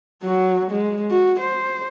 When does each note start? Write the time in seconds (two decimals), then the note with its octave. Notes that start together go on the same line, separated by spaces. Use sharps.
0.23 F#3 F#4
0.71 G#3
1.11 F#4
1.40 C5